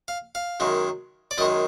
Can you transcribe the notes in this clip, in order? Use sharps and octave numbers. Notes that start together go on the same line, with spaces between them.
F5
F5
F#2 D#3 G#3
D5
F#2 D#3 G#3 D#5